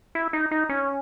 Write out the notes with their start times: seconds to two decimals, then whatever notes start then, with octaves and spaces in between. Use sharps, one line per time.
0.15 E4
0.33 D#4
0.51 D#4
0.69 C#4